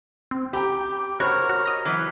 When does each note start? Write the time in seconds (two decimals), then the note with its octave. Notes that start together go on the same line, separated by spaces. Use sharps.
0.31 C4
0.53 G4 G5 A#5 B5
1.20 F#4 A#4 C5 C#5 B5
1.49 F#4
1.66 D#5 A#5
1.85 E3 F#3 B3